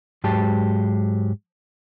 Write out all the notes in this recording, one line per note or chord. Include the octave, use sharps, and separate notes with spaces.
G#2 F#3 G#3 G4 A5